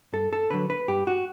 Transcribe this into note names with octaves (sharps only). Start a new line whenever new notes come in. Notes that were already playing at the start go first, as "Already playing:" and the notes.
G2 A4
A4
D3 F#3 B4
B4
G2 G4
F#4